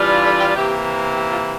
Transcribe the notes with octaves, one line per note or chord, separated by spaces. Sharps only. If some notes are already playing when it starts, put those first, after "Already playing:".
Already playing: E3 G3 D4 F4
G4
A4
G4
C3 E3 A#3 G4
G4
F4